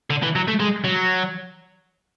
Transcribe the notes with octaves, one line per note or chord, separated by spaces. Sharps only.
D3
E3
F#3
A3
G#3
F#3